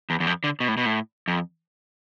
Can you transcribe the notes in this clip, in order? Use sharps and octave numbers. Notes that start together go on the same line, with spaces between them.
E2
E2
F2
D3
B2
A2
B2
A2
F2